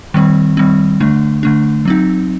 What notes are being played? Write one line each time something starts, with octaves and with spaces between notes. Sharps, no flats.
D#3 G3 C4
D#3 G3 C4
D3 A3 D4
D3 A3 D4
F#3 C4 D#4